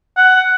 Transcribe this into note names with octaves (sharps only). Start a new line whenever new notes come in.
F#5